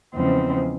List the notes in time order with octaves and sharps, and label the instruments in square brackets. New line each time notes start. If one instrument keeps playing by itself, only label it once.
[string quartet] E2 C#3 F3 G#3 C4